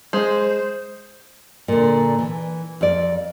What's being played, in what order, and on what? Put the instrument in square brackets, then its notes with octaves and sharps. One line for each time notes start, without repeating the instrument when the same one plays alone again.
[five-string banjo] G#3 [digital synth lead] C5
[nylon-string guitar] A#2 D3
E3
F2 D5